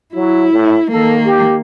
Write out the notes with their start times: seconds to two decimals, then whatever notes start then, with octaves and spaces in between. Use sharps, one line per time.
0.15 F#3 E4
0.53 A2
0.91 D#3 A#3 A4
1.26 G4